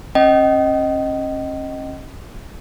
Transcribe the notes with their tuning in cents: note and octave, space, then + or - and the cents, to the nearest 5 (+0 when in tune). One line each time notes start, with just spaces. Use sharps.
C#4 -40 D#5 +0 G5 -40